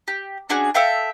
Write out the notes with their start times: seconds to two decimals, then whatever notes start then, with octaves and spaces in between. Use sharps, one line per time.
0.08 G4
0.49 C#4 D4 F#4 G#4
0.74 A4 E5 F5 G5